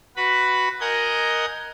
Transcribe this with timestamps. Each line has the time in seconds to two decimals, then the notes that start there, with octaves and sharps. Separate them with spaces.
0.16 F#4 B4 B5
0.81 A#4 D#5 F#5 G#5 G6